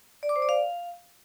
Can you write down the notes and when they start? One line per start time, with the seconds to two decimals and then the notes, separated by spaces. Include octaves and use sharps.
0.23 D5
0.29 D6
0.36 C5
0.42 D5
0.49 F5